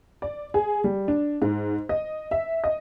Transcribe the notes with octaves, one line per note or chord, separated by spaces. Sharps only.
D5
G#4
G3
D4
G#2
D#5
E5
D#5